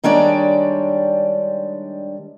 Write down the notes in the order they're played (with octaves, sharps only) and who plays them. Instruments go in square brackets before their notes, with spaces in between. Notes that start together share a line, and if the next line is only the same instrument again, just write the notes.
[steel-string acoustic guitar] D#3 G3 G#3 D4 C#5 D5